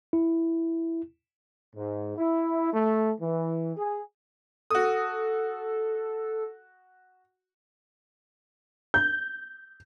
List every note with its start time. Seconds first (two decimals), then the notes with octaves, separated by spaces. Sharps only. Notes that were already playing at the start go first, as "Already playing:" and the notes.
0.13 E4
1.75 G#2
2.18 E4
2.72 A3
3.20 E3
3.76 G#4
4.70 F#4 A4 D#6
8.94 G6